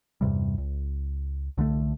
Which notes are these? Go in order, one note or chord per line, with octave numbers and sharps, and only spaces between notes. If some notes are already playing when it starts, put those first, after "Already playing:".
E2 G2 C3 G3
C#2
C2 D3 G3 A3